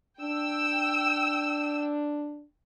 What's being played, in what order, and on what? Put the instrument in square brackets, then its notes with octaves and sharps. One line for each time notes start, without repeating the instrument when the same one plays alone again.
[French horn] D4 [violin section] G5 E6